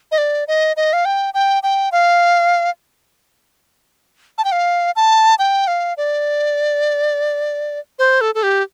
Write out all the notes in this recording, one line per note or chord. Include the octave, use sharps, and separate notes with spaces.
D#5
D5
D#5
D#5
F5
G5
G5
G5
F5
A5
G5
F5
A5
G5
F5
D5
C5
A4
A4
G4